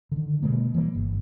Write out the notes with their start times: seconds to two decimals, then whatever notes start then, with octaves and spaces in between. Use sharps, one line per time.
0.12 D3 D#3
0.42 B2 G#3 A#3
0.74 E3 G3 A3 A#3
0.95 G1